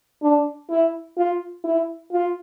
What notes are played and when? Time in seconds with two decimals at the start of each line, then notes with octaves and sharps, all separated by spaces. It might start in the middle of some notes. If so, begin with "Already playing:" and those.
0.22 D4
0.69 E4
1.17 F4
1.64 E4
2.12 F4